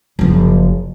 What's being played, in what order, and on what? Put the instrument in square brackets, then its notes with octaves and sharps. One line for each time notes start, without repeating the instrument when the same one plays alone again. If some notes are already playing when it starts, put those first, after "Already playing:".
[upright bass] F#1 F3